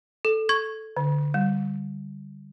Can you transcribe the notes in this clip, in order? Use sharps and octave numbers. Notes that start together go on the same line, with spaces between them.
A4
C#6 G#6
D3
G3